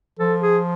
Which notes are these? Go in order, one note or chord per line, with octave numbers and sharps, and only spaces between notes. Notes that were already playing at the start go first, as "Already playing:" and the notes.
F3 A4
G#4